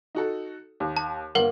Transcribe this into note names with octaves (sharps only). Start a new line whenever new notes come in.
D#4 F#4 A4
D#2
A5
G1 A#3 A#4 F#5 G7